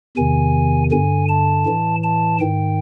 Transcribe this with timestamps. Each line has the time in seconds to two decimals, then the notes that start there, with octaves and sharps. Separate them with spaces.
0.17 E2 C3 D#3 G#5
0.91 G2 D3 G#5
1.29 A5
1.66 A2 E3
2.04 A5
2.40 G#2 D#3 G5